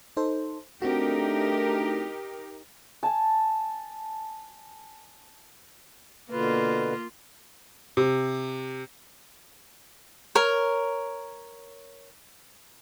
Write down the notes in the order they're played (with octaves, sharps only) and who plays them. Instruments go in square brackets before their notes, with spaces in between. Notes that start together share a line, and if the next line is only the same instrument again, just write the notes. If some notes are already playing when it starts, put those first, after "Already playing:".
[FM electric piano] D#4 A4 C5
[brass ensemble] A3 D4 [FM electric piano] C4 F#4 [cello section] D#4 G4 A#4
[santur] G#5 A5
[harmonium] B2 D3 B4 [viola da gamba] A#3 F4
[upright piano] C3
[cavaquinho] A#4 C#5